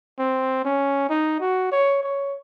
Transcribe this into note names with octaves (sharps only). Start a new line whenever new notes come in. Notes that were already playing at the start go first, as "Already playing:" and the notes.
C4
C#4
D#4
F#4
C#5
C#5